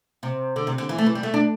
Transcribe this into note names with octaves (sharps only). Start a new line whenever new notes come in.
C3
D3
C3
D3
E3
A3
E3
G3
A3
D4